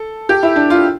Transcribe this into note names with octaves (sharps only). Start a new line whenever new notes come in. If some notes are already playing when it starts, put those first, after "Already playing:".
Already playing: A4
G4
E4
D4
F4